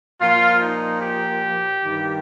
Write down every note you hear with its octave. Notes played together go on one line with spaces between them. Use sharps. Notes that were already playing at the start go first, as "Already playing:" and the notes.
A#2 F3 F4
D#4
G4
G2 D#3